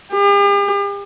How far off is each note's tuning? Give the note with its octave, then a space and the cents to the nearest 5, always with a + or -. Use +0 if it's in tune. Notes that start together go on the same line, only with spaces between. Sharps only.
G4 +45